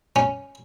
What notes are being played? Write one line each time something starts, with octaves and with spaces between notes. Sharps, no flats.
C#4